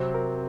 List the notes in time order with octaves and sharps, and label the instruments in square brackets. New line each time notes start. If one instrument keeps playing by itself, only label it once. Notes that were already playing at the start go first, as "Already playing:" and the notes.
Already playing: [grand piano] C3 F#3 C4 [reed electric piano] C5
[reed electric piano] A#4